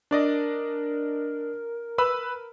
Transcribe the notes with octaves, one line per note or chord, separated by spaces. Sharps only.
D4 A#4 D5 D#5
B4 B5 E6